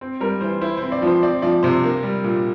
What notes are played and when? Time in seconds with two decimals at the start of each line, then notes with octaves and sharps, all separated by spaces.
0.01 C4
0.21 G3 A#4
0.41 E3 C5
0.61 E4 C5
0.77 C4 C5
0.92 D5
1.02 F3
1.07 C5
1.23 C4 D5
1.42 F3 D5
1.63 C3 C5
1.84 A#3
2.03 G3
2.24 A#2